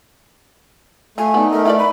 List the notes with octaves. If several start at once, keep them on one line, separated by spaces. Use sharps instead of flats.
A3 F4 G#5
B3 D4 D#4
A3 A#4
E4 A#4 B4 D5
B5